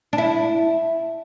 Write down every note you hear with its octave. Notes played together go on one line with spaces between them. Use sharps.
D4
E4